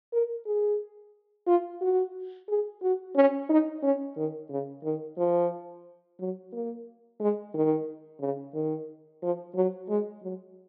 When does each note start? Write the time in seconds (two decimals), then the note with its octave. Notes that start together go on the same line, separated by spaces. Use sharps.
0.13 A#4
0.46 G#4
1.47 F4
1.81 F#4
2.49 G#4
2.82 F#4
3.16 C#4
3.50 D#4
3.83 C#4
4.17 D#3
4.50 C#3
4.84 D#3
5.18 F3
6.20 F#3
6.53 A#3
7.20 G#3
7.54 D#3
8.20 C#3
8.54 D#3
9.22 F3
9.55 F#3
9.89 G#3
10.23 F#3